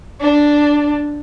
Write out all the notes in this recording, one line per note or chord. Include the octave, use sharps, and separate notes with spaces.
D4